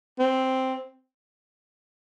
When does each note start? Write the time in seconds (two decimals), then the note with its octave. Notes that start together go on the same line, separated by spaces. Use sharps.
0.19 C4